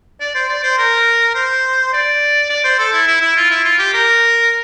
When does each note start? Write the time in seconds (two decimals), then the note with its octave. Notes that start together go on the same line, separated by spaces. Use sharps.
0.21 D5
0.35 C5
0.49 D5
0.63 C5
0.78 A#4
1.35 C5
1.93 D5
2.50 D5
2.64 C5
2.79 A4
2.93 E4
3.07 E4
3.21 E4
3.37 F4
3.51 E4
3.65 F4
3.79 G4
3.94 A#4